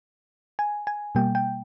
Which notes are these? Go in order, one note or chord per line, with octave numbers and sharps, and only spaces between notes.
G#5
G#5
B2 G3 A#3 G5
G5